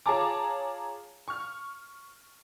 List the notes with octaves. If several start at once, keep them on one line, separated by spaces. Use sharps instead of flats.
F4 G#4 C#5 A5 A#5 D6
C#6 F6